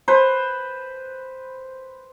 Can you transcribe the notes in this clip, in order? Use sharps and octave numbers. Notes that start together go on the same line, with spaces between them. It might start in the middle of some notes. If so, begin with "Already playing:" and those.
B4 C5